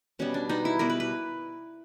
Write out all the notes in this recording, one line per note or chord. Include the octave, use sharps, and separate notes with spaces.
B2 G3 B3 C#4
D4
B2 G3 B3 D#4
E4
B2 G3 B3 A#4
B4
B4